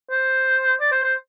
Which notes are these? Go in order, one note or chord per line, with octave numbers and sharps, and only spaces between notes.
C5
D5
C5
C5